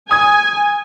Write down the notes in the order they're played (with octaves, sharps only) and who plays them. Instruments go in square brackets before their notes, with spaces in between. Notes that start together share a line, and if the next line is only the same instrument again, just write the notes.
[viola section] G#5 [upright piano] D#6 G#6